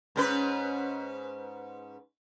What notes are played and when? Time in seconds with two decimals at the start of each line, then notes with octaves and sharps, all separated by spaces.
0.16 G#2 C#4 B4